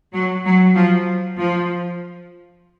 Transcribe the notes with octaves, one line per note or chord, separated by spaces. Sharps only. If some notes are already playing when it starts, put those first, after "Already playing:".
F#3
F#3
F3
F3